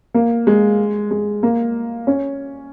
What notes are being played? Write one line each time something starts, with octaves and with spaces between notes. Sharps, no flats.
A#3
G#3
G#3
A#3
C#4